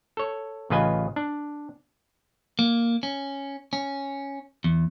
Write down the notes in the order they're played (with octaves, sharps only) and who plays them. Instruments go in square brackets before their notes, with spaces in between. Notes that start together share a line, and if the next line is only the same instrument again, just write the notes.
[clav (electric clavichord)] A4 C#5
A1 C#3 F4 B4 D#5 G#5
D4
[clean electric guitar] A#3
C#4
C#4
E2